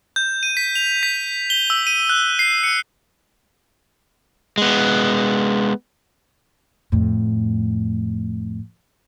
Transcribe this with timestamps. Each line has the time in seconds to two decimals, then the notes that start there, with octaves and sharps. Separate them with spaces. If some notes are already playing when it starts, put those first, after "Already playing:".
0.16 G6
0.43 D#7
0.57 B6
0.76 F7
1.03 B6
1.50 G7
1.70 E6
1.87 D#7
2.09 F#6
2.39 C7
2.64 C#7
4.58 G#3 B3
6.92 F2 A2